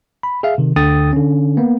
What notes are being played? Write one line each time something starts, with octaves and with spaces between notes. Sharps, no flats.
B5
G#4 E5 F5
C3 D#3
D2 D3 G5 D#6 A6
D3 C#4
A#3 B3